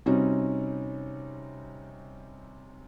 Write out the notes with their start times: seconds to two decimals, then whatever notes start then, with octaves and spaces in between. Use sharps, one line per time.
0.06 C3 G3 C4 C#4 D#4 F#4